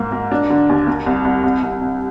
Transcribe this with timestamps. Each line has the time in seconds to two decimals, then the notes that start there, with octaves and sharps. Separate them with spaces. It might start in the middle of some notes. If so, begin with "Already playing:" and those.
Already playing: G#2 A#3
0.12 A#3
0.31 D4
0.50 D3
0.69 D#2
0.87 A#3
1.06 C2
1.25 C2
1.44 C2
1.63 C2
1.81 C3